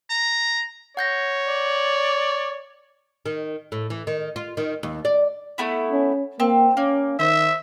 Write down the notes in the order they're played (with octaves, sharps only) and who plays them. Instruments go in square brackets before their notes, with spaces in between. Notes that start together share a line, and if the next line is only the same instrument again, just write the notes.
[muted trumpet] A#5
[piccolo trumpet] C#5 [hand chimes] F#5 G6 A#6
[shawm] D5
[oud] D#3
A2
E3
D#3
F4
D#3
D#2
D5
[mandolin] A3 B3 E4
[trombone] C#4
[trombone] A#3 [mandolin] C4
[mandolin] A#3 [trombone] C#4
[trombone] D#3 [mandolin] C5 [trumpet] E5